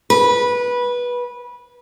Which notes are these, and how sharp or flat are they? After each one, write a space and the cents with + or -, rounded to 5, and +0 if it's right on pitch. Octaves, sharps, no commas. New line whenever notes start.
B4 -15